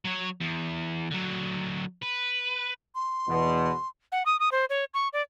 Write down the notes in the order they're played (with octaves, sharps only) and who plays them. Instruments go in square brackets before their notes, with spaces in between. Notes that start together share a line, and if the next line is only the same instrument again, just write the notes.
[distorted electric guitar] F#3 C#5
E2
D3 F#3
B4
[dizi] C6
[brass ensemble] E2 B2
[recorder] F#5
D#6
D#6
C5
C#5
C#6
D5